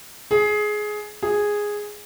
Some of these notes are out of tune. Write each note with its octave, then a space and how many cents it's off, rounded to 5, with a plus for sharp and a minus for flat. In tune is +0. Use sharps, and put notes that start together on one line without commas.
G#4 +15
G#4 -5